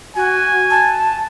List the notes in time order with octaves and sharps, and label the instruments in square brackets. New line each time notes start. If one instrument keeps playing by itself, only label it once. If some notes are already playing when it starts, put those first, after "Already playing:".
[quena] F#4 [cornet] G#5
[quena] A5